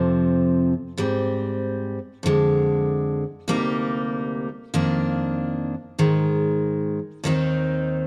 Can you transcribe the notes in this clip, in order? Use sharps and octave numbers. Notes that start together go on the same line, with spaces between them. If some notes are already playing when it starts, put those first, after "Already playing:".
Already playing: F2 C3 F3 C4
G#2 G3 C4
F2 D3 G#3
D2 C3 G3 A#3 D#4
F2 D#3 A#3 D4
G#2 D#3 G#3
D#2 D#3 G#3 C4 D#4